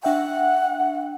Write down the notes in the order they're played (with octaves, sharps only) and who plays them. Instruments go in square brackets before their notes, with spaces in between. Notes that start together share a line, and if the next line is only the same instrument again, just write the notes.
[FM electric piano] D4 E5 G5 [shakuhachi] F#5